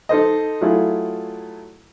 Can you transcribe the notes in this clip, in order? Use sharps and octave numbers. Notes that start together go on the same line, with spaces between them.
D#4 A4 C5 D#5
F#3 A3 E4 F4 G#4